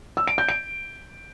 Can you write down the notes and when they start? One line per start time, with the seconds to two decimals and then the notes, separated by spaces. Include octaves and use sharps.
0.17 E6
0.28 D7
0.38 G6
0.49 D7